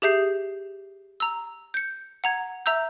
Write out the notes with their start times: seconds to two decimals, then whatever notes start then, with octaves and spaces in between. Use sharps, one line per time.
0.02 G4 G#4 E5 G6 C7
1.20 A#5 E6
1.74 G6 C#7
2.24 F#5 A#5 G#6
2.66 E5 A#5 E6 G6